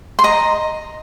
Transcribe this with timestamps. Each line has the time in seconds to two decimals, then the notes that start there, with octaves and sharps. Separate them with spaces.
0.19 C6
0.24 D#5 A#5